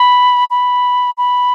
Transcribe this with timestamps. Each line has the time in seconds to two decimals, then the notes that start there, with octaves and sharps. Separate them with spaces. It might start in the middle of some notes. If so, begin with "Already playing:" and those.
Already playing: B5
0.50 B5
1.18 B5